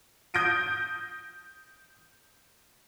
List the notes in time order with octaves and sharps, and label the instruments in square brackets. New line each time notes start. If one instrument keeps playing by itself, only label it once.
[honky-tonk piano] D#6 G6 A#6 D7 D#7